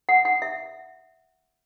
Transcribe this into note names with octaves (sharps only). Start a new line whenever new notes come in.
F#5
F#5
E5